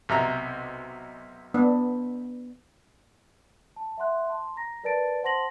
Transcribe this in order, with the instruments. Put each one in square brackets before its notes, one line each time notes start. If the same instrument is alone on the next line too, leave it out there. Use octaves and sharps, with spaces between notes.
[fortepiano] B1 C3 A#5
[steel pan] B3 D4
[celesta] A5
E5 F#5 C6 F#6
A5 C6
A#5 A#6
A#4 B4 D5 A5 A6 D7
C5 F#5 A5 C6 A#6 F#7